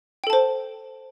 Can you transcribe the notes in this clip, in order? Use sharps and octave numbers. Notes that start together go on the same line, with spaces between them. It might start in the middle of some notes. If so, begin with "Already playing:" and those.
A4 C5 G5 A5